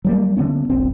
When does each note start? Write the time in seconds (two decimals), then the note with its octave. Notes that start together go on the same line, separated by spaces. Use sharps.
0.05 F#3 G3 A#3
0.37 D3 F#3 B3 C#4
0.70 D#1 A#1 C4